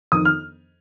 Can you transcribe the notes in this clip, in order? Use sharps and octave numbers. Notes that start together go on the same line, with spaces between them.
F2 D#3 D#6
F6